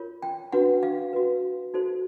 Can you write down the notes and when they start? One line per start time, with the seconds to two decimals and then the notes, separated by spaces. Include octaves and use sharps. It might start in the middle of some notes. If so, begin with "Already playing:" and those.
Already playing: F4 A#4 C#5
0.22 G5
0.52 D4 F#4 B4 F#5
0.83 F5
1.13 F#4 B4
1.74 D#4 F#4 A4 C5